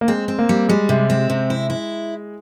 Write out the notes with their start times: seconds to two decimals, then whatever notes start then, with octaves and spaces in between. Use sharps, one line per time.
0.01 A#3
0.08 G#3 C4
0.28 C4
0.39 A#3
0.49 G3
0.69 G3 G#3
0.89 C3
1.10 C4
1.30 C3
1.50 E4
1.70 E4